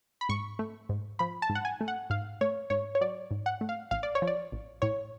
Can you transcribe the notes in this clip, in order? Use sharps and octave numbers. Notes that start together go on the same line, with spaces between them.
B5
G#2 C#6
A3
G#2
F3 B5
A5
G#2
F#5
G#5
A3
F#5
G#2 F5
A3 C#5
G#2 C#5
C#5
F#3 D5
G#2
F#5
A3
F5
A1 F5
D5
C#5
F3
D5
A1
A2 C#5